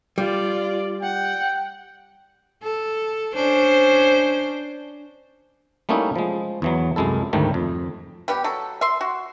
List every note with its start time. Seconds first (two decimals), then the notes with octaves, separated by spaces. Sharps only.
0.18 G3 F4 D5
1.03 F#5 G5
2.63 A4
3.35 C#4 D4 C5
5.89 G3 A3 A#3 C#4 D#4 E4
6.16 F3 G#3
6.62 E2 E3 F#3
6.96 C2 F#2 G#3 E4 A4
7.33 D2 G#2 D#3 G3 A3
7.54 F2
8.28 G3 B3 G4
8.44 F#3 A4
8.81 E5 C6
9.01 F#4